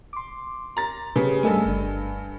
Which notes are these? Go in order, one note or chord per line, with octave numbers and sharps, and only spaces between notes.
C6 D6
A#5 A6
C#3 G4 G#4 B4
G2 A3 A4 D#5 G#5 E6
G1 D4